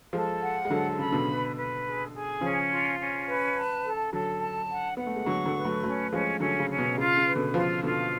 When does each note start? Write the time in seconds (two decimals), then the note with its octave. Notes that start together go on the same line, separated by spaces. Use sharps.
0.13 F3 G#3 A4
0.42 F#5
0.65 G#3
0.70 D3 F#3 A4
0.99 C#3 B5
1.12 B2 D3
1.27 B4
1.56 B4
1.85 G#4
2.13 G#4
2.41 C#3 F3 C#4
2.69 F4
2.99 C#4
3.27 B4
3.56 A5
3.84 A4
4.13 D3 F#3 A4
4.41 A5
4.70 F#5
4.97 B3 F#5
5.06 A3
5.16 G#3
5.26 D3 F#3 C#6
5.46 D3 F#3
5.54 B4
5.65 F#3 A3
5.83 F#3 A3 C#4
6.12 F3 G#3 C#4
6.40 D3 F#3 C#4
6.60 C#3
6.70 C#4
6.79 B2
6.98 C#3 F4
7.17 C#3
7.26 B4
7.35 B2 D3
7.54 C#3 F3 F4
7.83 B2 D3 F4